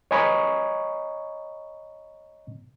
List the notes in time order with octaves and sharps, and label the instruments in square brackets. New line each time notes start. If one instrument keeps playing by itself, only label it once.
[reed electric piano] C#5 D#5 G#5 A#5 B5 C#6